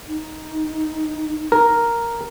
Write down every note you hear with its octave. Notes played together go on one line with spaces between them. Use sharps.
D#4
A#4